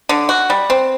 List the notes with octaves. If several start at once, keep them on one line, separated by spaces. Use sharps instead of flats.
D3
F#4
G3
C4